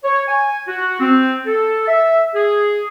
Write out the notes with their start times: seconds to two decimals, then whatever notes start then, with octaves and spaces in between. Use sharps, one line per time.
0.04 C#5
0.28 G#5
0.68 F#4
1.00 C4
1.46 A4
1.88 E5
2.35 G#4